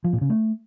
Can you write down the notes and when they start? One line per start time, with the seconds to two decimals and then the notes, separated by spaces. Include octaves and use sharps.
0.04 F3
0.13 A#2
0.21 C#3
0.30 A3